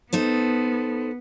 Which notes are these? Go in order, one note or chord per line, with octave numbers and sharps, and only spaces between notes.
B3 D#4 A4 C5